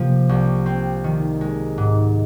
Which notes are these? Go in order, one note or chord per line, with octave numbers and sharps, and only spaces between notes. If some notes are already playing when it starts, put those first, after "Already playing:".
Already playing: C3 F3 A#3
C2
C4
D#3
G#3
G#2